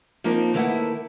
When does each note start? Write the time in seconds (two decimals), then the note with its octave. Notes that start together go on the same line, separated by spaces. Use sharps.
0.24 F3 A#3 C4 D4 D#4
0.54 D#3 A3 A#3 E4 B4 F#5